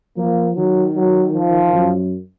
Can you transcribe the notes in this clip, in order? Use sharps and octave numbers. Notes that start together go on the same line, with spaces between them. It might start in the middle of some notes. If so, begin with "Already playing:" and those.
F3 A#3
D#3 F#3
F#3
F3
F#2